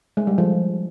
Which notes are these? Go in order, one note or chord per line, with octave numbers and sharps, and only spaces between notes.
G#3
G3
F3